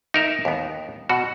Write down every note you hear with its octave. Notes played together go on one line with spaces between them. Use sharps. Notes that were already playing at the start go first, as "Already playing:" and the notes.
D#4 A#4 E5
D#2 B3
B2 F#4